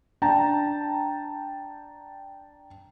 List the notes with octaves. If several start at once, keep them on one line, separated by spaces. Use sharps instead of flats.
D4 G5 A5 A#5